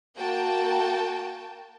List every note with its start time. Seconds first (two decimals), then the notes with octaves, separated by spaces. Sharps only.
0.19 A#3 F#4 G5 A5